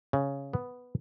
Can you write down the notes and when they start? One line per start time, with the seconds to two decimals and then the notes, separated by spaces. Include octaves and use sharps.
0.13 C#3
0.53 B3